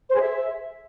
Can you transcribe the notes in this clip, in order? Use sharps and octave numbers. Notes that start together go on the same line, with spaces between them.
C5
G#4
E5